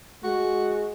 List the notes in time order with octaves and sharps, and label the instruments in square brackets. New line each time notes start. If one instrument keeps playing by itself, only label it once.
[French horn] G#3 [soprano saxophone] F#4